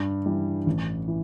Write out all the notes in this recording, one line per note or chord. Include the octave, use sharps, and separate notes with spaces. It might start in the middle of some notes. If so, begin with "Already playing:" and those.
Already playing: G2
E3 G3
A1
E3